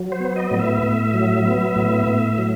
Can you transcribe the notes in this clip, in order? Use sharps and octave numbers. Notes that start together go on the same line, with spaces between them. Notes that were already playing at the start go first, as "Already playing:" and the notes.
Already playing: F#3
C5
B3
D#5
A2
E5
A2
F#3
B3
A2
A2
F#3